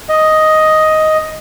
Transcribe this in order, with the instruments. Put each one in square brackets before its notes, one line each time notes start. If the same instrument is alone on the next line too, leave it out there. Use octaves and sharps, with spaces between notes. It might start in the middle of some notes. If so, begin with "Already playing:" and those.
[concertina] D#5